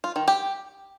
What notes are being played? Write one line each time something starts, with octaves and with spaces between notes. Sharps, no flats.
F4
D#3
G4